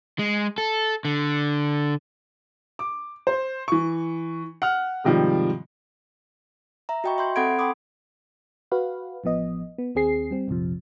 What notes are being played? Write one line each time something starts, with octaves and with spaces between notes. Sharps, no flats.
G#3
A4
D3
D6
C5
E3 C#6
F#5 F6
G#2 C3 D#3 F3 G3
E5 A#5
F#4 D#5 G5 B5 C#6
E5 C6 G6
C4 A4 F#5 B5 G#6 D7
G5 B5 C6 D6 D#6
F#4 B4 F5
A1 F3 B3 D#5
B3
D#2 C4 G#4 C7
G3 C4
A#1 F2 C3 F3